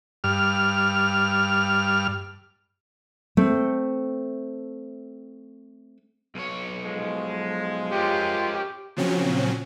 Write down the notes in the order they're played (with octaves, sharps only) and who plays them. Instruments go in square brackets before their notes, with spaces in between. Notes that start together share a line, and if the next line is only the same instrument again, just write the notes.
[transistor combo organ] G2 F6
[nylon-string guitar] A3 C4
[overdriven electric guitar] B1 C#5
[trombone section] F3 G#3
[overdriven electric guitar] C#4 A#4 [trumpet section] F4 G5 [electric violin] G4
[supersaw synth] A#2 C#3 F3 F#3 C4 C#4